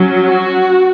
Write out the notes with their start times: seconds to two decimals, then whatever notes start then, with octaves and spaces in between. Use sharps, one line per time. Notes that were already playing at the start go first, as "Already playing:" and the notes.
Already playing: F#3 C#4
0.25 F#4